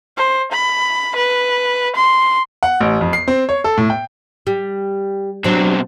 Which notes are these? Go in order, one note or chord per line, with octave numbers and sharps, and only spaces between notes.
C5
B5
B4
C6
F#5
A1
F2
C7
C4
C#5
A4
A2
G5
G3
B2 F#3 C4 D4